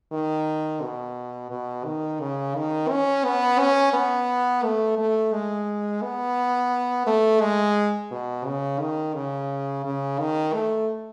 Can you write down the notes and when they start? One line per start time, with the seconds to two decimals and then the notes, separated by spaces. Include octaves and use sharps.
0.12 D#3
0.82 B2
1.50 B2
1.85 D#3
2.20 C#3
2.55 D#3
2.90 C#4
3.25 B3
3.59 C#4
3.93 B3
4.64 A3
4.98 A3
5.32 G#3
6.02 B3
7.06 A3
7.41 G#3
8.11 B2
8.45 C#3
8.80 D#3
9.14 C#3
9.85 C#3
10.20 D#3
10.54 A3